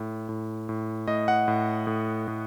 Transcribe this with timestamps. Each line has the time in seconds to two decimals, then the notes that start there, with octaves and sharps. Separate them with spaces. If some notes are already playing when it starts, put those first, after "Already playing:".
Already playing: A2
0.29 A2
0.69 A2
1.08 A2 D#5
1.28 F#5
1.48 A2
1.87 A2
2.28 A2